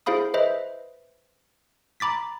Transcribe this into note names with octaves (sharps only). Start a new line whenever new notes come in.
E4 G#4 C5 F5 B5 D#6
B4 C5 D#5 E5
A#5 B5 D6 A6 B6